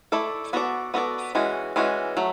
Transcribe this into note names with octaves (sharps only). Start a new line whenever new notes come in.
A3 E4 A4 D5
B3 F#4 A4 D5
B3 F#4 A4 D5
E3 G#3 C#4 F#4
E3 G#3 C#4 F#4
F#3 A3